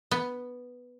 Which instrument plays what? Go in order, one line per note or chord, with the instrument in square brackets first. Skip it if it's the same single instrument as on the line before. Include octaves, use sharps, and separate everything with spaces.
[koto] B3